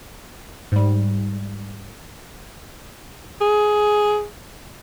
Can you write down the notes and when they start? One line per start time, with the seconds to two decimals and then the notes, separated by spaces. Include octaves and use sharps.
0.72 G#2 G3
3.41 G#4